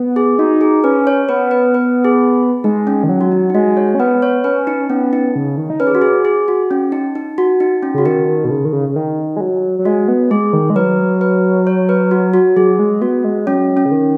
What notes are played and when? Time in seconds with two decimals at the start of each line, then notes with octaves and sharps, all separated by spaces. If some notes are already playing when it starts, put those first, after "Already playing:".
Already playing: B3
0.16 G#4
0.39 D#4 F#4
0.61 G#4
0.84 C#4 B4
1.07 C#5
1.29 B3 B4
1.51 B4
1.74 B4
2.05 G#4
2.64 G#3 D#4
2.87 C#4
3.03 D#3
3.09 F#3
3.21 F#4
3.32 D#4
3.50 D#4
3.54 G#3 F#4
3.77 C#5
3.95 C#4
3.99 B3 B4
4.22 C#5
4.44 C#4 B4
4.67 D#4
4.90 B3 C#4
5.13 D#4
5.35 C#3
5.57 D#3
5.70 D#4
5.80 C#4 B4
5.87 G#4
5.95 F#4
6.02 G#4
6.25 G#4
6.48 F#4
6.71 C#4
6.92 D#4
7.15 D#4
7.38 F#4
7.60 D#4
7.83 C#4
7.94 C#3 F#4
8.06 D#3 D#4
8.28 D#3
8.44 B2
8.50 C#3
8.65 D#3
8.73 C#3
8.89 C#3
8.96 D#3
9.37 G#3
9.41 F#3
9.79 F#3
9.85 G#3 F#4
10.08 B3
10.31 G#3 G#4
10.53 D#3
10.70 G#3
10.76 F#3 B4
11.21 B4
11.67 C#5
11.89 B4
12.11 F#4
12.34 F#4
12.56 F#3 G#4
12.79 G#3
13.01 B3 F#4
13.24 G#3
13.46 F#3 C#4
13.77 C#4
13.86 C#3
13.91 D#3